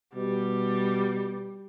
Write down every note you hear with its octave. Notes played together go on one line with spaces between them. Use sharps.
B2 G3